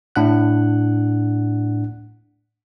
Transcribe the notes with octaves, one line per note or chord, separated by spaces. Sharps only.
A2 D4 F#5 F#6